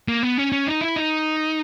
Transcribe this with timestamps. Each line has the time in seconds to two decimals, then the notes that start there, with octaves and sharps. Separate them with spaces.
0.08 A#3
0.23 B3
0.38 C#4
0.52 C#4
0.67 D#4
0.81 E4
0.96 D#4